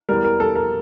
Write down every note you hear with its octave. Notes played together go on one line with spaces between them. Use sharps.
E2 E3 G3 A#4
A#4
A4
A#4